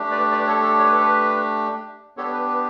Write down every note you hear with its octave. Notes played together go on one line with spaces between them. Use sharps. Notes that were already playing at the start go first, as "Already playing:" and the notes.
Already playing: A3 D4 G4
B4 D5
B4 D5
A4 C#5
A4
C#5
B4
A4
B4
B3 D4 G4 A4 C#5
B4
B4